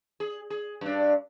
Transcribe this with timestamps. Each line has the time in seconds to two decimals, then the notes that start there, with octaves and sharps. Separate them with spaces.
0.20 G#4
0.50 G#4
0.81 G2 D4